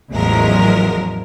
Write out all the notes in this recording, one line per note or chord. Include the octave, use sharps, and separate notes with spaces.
A1 E2 F3 F#3 G#3 A#4